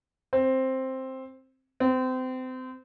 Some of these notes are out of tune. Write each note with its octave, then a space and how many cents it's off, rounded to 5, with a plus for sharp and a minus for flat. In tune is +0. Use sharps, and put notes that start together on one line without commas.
C4 +5
C4 -30